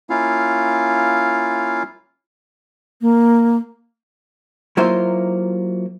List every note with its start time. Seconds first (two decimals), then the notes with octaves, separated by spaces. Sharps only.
0.10 A#3 C#4 E4 F4 F5
3.01 A#3
4.77 F#3 A#3 E4 F4 C5